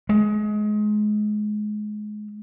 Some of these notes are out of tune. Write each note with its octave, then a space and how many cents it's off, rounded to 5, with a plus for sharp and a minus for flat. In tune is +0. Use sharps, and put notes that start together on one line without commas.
G#3 +25